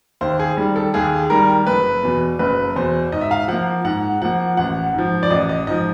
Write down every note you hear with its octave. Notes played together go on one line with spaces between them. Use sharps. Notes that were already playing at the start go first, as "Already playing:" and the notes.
D#2 C5
G#4
D#3 G3
A4
D#2 G#4
D#3 G3 A#4
F#1 B4
E2 B2
F#1 B4
E2 B2 C5
G#2 D#5
E5
F5
F3 A#3 F#5
G#2 F#5
F3 A#3 F#5
A1 F#5
G#2 F3
D5
A1 D#5
D#5
G#2 F3 D#5